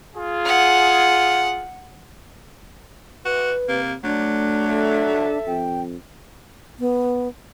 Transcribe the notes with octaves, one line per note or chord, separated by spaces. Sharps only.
F4 G#4
F#5
F#4 B4
C3 A#3
F#3 A3 D4
A4 E5
F2 G5
B3